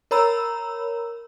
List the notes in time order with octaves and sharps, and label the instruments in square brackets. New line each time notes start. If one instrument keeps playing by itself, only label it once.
[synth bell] A#4 C#5 A#5 B5 E6